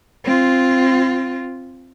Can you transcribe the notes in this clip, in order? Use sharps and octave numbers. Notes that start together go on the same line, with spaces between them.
C4 F4